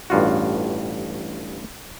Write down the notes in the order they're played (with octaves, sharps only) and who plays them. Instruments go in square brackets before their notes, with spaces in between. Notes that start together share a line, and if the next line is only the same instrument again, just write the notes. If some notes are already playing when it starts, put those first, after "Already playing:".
[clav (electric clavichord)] A1 G2 F4 F#4